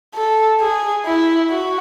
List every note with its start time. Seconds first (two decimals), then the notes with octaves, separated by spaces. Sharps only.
0.15 A4
0.60 G#4
1.06 E4
1.50 F#4